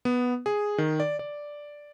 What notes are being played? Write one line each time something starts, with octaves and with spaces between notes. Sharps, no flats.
B3
G#4
D#3
D5
D5